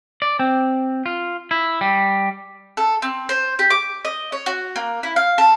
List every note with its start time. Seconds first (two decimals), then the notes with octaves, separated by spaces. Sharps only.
0.22 D5
0.39 C4
1.06 F4
1.51 E4
1.81 G3
2.77 A4
3.02 C4
3.29 C5
3.59 G4
3.70 D6
4.05 D#5
4.32 C#5
4.46 F#4
4.76 A#3
5.03 E4
5.16 F5
5.38 A4